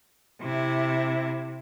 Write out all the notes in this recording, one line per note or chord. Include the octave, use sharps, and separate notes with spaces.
C3 E4